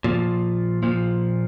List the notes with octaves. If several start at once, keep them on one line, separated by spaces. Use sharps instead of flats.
A#2 F3
A#2 F3